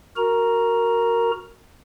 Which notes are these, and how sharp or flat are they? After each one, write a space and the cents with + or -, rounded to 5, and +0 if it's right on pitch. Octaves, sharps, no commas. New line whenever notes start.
F#4 +0 A#4 -10 A#5 +10